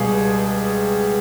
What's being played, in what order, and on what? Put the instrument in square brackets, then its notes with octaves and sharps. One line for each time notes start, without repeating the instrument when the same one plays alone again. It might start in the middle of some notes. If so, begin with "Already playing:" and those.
Already playing: [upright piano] C#2 B2 G3 G#4